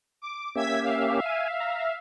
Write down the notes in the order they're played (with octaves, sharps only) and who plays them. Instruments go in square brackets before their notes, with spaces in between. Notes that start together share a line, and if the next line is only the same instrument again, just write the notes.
[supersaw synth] D6
[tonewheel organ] A#3 C#4 G4 [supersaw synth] E5 G#6 B6
[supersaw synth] E5 F5
[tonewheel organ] G#5
A#5